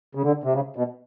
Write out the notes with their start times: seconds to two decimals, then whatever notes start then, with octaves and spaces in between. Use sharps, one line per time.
0.15 C#3
0.23 D3
0.44 C3
0.53 C#3
0.76 B2